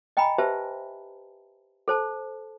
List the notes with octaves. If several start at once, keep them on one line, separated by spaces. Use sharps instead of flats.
D#5 G5 G#5 A#5 B5
G4 B4 C5 E5 A5
A4 C5 A5